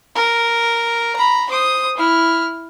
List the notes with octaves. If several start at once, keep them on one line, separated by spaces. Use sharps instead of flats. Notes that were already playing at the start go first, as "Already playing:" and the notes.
A#4
A#5 B5
C5 D#6
E4 F6